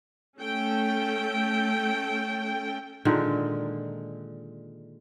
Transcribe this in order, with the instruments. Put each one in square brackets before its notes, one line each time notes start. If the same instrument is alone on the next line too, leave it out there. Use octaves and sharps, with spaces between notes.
[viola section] A3 C#4 A4 G5
[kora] A#2 D3 D#3 G#3